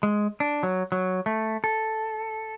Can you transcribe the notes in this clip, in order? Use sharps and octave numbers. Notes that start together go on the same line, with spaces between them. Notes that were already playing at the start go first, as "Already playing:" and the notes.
G#3
D4
F#3
F#3
A3
A4